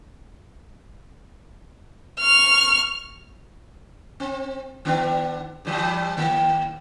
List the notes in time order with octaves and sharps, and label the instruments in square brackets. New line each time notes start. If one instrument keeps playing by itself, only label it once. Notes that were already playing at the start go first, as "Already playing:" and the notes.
[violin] C#6 F6
[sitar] C4
D#3 B3 D4
G2 E3 G3
D#3 A#3